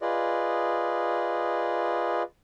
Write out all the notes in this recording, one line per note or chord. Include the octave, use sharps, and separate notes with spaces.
F4 G#4 B4 D5 D#5